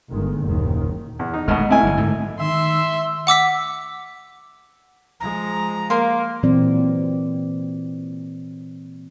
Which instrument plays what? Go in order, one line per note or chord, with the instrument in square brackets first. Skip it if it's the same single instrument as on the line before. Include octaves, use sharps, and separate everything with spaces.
[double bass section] G1 D#3 G#3
F#1 D#2 A#2 D#3
[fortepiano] E2
D#4
[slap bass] D#1 G#3 A3 [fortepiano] B2 D#5 F6
[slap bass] A3 C4 [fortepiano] E4 D#5 G#5
[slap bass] G1 C3 F#3
G#2 D3 A3
[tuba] D#3 [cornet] E5 [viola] C6 [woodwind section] E6
[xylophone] F#5 D6 E6 B6
[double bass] F3 G#3 [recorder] A#5
[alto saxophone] A#3 [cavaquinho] A#4 C6
[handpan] A#2 E3 F#3 C4 D5